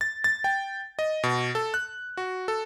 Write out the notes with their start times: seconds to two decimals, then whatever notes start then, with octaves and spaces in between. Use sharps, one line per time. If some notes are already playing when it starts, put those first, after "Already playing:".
0.01 A6
0.24 A6
0.44 G5
0.99 D#5
1.23 B2
1.55 A4
1.74 F#6
2.17 F#4
2.48 A4